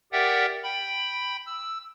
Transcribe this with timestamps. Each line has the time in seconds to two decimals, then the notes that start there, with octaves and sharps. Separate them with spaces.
0.12 G4 A#4 D5 E5 F#5 G5
0.63 G5 B5
1.46 E6